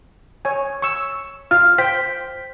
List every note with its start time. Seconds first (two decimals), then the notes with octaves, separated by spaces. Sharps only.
0.45 C#5 G#5
0.82 C#6 E6
1.51 F4 F5 F6
1.78 C5 G5 B6